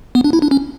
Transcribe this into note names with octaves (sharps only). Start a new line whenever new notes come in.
B3
D4
E4
D4
C#4